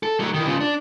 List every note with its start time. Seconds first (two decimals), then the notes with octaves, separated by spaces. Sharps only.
0.03 A4
0.20 F#3 A3
0.34 D#3 E3
0.47 C#3 F3
0.60 D4